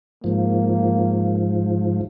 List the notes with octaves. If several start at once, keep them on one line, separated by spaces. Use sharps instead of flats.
G#2 F3 A#3